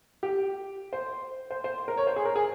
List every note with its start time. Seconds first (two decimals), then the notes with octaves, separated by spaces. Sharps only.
0.23 G4
0.93 C5
1.50 C5
1.64 C5
1.88 A#4
1.97 C#5
2.07 C5
2.16 G#4
2.25 A#4
2.36 G#4